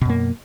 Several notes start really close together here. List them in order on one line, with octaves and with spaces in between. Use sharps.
B2 F#2 A#3